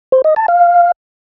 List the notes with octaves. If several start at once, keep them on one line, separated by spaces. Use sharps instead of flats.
C5
D#5
A5
F5